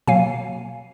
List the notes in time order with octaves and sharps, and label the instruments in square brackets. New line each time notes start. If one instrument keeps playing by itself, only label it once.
[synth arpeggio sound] B2 F#3 A#3 F5 G#5